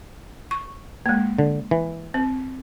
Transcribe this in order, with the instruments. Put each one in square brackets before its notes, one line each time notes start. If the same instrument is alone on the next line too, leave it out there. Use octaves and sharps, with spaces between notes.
[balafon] C#6
G#3 A#3
[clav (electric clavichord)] D3
E3
[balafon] C4